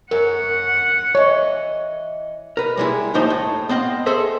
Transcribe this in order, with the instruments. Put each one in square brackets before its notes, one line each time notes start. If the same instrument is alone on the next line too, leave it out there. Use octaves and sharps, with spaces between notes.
[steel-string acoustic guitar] F#2 F#4 [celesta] A#4 [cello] F#5
[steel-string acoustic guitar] E3 D#5 [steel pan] C#5
[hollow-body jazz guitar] A#4 B4
G3 G#3 E4
D#2 A2 F3 D#4 C5 D#5
A2
B3 C4 D#5 F5
G#4 A4 C5 D#5 E5